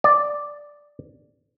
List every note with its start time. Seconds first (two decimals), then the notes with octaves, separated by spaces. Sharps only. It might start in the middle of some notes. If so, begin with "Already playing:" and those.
0.04 D5